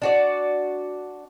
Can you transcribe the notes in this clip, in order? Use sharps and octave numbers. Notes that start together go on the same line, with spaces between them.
D4 F#4 D5